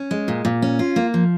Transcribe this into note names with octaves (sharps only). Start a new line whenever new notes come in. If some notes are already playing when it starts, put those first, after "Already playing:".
Already playing: C#4
G#3
A#2
A#2
C#4
F4
A#3
F3